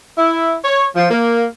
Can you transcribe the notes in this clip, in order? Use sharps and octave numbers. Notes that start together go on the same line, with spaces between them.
E4
C#5
F3
A#3